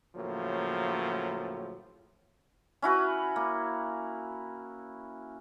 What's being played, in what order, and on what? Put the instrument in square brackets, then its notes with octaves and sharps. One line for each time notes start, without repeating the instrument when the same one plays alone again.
[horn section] A2 C#3 F3 F#3 A#3
[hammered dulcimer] C#4 E4 F#4 B4
A#3